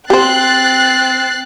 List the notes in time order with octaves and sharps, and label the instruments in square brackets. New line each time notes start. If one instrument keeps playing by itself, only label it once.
[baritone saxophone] C4 [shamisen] G4 C5 [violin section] F#6 A6 C7